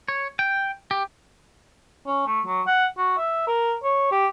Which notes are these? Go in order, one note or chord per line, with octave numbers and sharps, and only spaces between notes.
C#5
G5
G4
C#4
A3
F#3
F#5
F#4
E5
A#4
C#5
G4